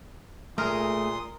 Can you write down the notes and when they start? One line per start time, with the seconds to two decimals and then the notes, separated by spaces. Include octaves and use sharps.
0.58 A#2 A3 G#4 A#4 C6 D#6